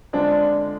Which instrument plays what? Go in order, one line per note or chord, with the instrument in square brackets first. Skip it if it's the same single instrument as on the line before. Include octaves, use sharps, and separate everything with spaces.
[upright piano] D3 F3 G#3 C4 [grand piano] D4